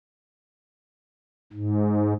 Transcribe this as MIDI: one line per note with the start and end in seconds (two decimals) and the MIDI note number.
1.53 2.13 44